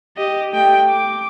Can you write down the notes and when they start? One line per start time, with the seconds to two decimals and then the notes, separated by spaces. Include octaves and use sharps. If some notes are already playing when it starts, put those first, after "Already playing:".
0.17 G4 D#5
0.53 A3 G5
0.90 D6